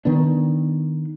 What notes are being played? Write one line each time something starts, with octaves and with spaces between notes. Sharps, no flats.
D#3 B3 D4